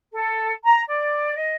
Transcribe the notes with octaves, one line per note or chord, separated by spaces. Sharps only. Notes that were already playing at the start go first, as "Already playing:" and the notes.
A4
A#5
D5
D#5